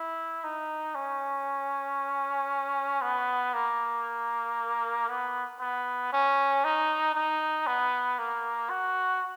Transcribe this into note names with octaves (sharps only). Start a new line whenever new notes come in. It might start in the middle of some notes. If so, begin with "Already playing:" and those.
Already playing: E4
D#4
C#4
B3
A#3
B3
B3
C#4
D#4
D#4
B3
A#3
F#4